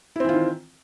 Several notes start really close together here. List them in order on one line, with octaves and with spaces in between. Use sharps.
E4 C4 E3 F4 D#3